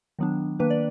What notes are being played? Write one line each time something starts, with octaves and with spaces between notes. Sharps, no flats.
D#3 F#3 B3 D4
D#3 A#3 D4 B4
D5